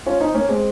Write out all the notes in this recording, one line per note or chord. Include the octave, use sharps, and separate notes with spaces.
C#4 F4
C4 D#4
A#3 C#4
G#3 C4